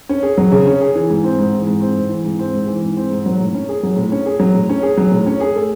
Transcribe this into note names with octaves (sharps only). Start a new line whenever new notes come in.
C#4
G#4
F#3
C#3
C#4
G#4
E3
G#2
C4
G#2
E3
G#2
C4
G#2
E3
G#2
C4
G#2
E3
G#2
C4
G#2
F#3
A2
C#4
G#4
F#3
A2
C#4
G#4
F#3
A2
C#4
G#4
F#3
A2
C#4
G#4
A3